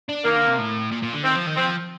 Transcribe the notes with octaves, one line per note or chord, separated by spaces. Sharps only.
D4
D#3 A#3
D3
C3
A2
A#2
A#2
D3
D#3 C4
F3
D#3
F3 C4